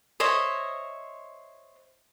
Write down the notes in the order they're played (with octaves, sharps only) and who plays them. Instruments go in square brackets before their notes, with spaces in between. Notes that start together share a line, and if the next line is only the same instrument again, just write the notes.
[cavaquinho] C5 C#5 D#5 E5